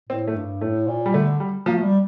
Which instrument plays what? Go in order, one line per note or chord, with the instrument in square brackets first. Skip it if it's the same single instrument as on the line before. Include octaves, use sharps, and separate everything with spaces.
[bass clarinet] A2 [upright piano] C4
[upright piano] A3
[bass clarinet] G2
[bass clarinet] A2 [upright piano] A3
[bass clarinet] A#2
[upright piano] G3
[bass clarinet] D3 [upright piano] A3
[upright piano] G3
[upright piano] F3 [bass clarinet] A#3
[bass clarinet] A3
G3